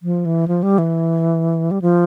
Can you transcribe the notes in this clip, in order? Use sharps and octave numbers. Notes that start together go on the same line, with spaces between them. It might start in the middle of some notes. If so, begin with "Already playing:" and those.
F3
E3
F3
G3
E3
G3
F3